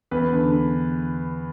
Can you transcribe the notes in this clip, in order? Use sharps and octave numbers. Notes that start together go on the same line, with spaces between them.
E2 B4
D3
D3